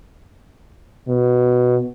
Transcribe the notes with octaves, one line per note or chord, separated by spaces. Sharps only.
B2